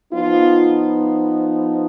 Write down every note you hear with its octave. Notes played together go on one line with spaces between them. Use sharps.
F3 B3 D#4 F4